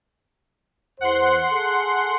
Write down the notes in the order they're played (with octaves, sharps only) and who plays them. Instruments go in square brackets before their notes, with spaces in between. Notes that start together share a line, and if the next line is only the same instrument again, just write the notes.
[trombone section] E2 C5 [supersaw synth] F#5 C6
[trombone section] G#4 A4